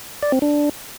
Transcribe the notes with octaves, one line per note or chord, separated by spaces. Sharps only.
D5
C4
D4